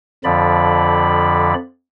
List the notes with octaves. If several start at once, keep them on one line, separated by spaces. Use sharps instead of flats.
F2 D3 F3 D5 B5